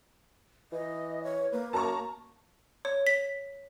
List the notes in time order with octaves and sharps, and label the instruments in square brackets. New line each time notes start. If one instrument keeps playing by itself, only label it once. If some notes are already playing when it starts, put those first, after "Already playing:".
[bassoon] E3 [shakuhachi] D#5
[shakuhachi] C#5
[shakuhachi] A#3 [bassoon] B4
[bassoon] F#2 [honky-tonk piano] A5 A#5 C#6
[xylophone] C#5
B6